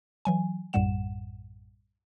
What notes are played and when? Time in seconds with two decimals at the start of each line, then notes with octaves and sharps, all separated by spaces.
0.25 E3 F#3 G#5
0.73 A#1 F#2 A2 G3 F#5 E7